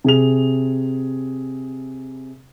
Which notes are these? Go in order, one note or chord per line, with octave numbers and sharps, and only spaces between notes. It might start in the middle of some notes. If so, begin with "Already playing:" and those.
C3 G#4 F7